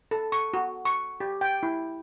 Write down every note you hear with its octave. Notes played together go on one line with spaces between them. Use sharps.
A4
C#6
F#4
C#6
G4
G5
E4